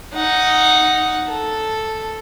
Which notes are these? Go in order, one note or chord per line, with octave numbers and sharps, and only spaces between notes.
D#4 F#5
A4